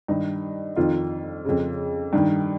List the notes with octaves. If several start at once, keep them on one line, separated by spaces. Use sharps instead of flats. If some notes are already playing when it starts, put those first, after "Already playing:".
G2 D#3 D#4
F2 D#3 F4
F2 C#3
G2 D#3